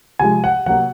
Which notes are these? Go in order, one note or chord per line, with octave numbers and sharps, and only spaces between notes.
C3 F3 G#3 G#5
F#5
C3 F#3 A#3 F#5